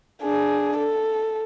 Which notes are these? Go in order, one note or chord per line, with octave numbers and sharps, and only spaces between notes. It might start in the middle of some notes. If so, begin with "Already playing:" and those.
D4 G#4
A4